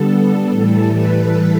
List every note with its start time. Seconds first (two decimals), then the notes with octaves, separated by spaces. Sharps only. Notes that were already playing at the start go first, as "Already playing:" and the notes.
Already playing: D3 G3 B3 A4
0.51 A2 E3 G3 A4
0.98 B4